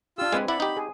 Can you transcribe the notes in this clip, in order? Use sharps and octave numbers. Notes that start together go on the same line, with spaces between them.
D4 F4 G4 E6
G#3 C4 B4 G#5
E4 D5 F#5 B5
D#4 G4
G#4